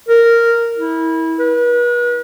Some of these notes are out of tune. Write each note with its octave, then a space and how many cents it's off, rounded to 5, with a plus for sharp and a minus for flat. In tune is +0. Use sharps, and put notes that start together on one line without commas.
A#4 -5
E4 -25
B4 -40